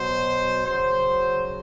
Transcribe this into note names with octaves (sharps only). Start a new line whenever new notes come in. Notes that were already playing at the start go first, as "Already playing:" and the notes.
Already playing: B2 F#3 C5
C#3 F#3 C5